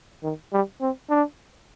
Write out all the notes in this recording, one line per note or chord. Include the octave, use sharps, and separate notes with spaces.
D#3
G3
C4
D4